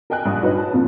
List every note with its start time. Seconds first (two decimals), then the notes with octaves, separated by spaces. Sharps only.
0.10 A#4 D#5 G5 G#5 F#6
0.25 A#1 G2 D4 D#6
0.42 D#4 F#4 B4 C#5 D#5
0.57 A5
0.73 F2 A#2 F3